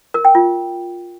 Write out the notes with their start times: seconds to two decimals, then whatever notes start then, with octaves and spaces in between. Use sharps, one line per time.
0.14 A#4
0.25 G5
0.35 F4